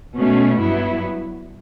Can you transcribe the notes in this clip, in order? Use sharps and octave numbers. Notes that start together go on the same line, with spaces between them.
B2 A3 C#4
G2 F#3 B3 E4